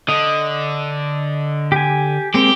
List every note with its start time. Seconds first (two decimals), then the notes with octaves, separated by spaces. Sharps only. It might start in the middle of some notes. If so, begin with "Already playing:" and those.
0.09 D3 D#5
1.72 G4 G#5
2.34 G#3 A#3 C4 G4